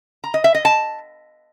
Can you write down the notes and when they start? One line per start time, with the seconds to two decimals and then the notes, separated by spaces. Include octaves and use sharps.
0.24 A#5
0.34 D#5
0.44 E5
0.55 D#5
0.65 A5